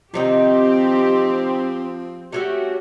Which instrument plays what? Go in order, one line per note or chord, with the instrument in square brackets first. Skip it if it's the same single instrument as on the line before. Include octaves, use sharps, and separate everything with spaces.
[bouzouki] C3 D#3 D#4 [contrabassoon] F3 [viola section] C4 [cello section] G4
[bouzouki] A3 C#4 E5 [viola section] F#4 G4